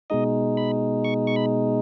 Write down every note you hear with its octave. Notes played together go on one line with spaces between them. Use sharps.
B2 G#3 D#4 D#5
B5
C#6
C#6
B5